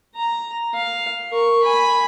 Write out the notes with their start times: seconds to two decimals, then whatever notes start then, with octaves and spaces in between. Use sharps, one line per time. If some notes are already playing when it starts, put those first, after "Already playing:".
0.15 A#5
0.74 F5
1.31 A#4 C#6
1.63 G#5 B5